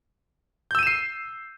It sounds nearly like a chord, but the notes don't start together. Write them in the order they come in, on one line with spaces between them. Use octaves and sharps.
G6 E6 D#7 E7 C7